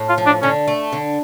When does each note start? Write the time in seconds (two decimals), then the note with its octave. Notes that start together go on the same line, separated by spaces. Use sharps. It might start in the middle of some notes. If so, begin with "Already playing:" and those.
Already playing: A2
0.09 F4
0.18 F3
0.26 D4
0.42 D3 C#4
0.68 A3
0.93 D3